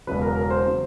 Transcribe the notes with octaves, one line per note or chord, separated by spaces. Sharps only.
E1 E2 C#3 F#3 B4
A#4
A#4
C5
C#3 F#3